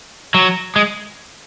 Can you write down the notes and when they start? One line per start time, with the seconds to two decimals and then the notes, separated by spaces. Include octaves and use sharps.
0.34 F#3
0.76 G#3